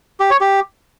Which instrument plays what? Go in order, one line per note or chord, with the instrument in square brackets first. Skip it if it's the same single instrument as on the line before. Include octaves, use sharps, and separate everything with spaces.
[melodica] G4
C#5
G4